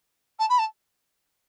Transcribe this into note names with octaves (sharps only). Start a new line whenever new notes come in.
A5
B5
A5